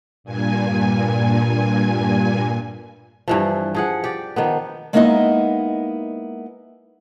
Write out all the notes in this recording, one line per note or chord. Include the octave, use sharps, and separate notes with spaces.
G2 A#2 G#5
G2 E3 F3
F3 G#4 F#5
G4 D5
D#3 F3 B3
G#3 A#3 B3 D#4 E4 D#5